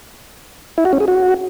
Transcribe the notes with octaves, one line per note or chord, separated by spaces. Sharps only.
E4
F#4
C#4
G#4
F#4